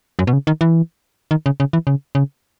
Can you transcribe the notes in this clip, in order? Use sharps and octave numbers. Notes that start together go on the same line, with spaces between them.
F#2
B2
C#3
D#3
E3
D#3
C#3
C#3
E3
C#3
C#3